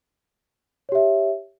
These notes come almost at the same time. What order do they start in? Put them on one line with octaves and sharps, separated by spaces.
C#5 G4 E5